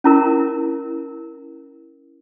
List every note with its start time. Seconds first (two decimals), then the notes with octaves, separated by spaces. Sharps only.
0.04 C#4 E4 A#4